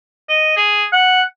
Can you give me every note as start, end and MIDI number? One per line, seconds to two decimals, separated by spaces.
0.29 0.53 75
0.57 0.85 68
0.93 1.22 78